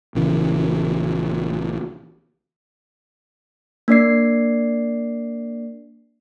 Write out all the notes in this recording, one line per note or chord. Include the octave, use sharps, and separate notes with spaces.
A#1 C#3 E3
A#3 D4 D5 C7